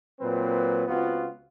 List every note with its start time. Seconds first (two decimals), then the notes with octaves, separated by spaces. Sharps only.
0.20 A#2 F#3 C4 B4
0.87 C#2 B3 C4 F4 F#4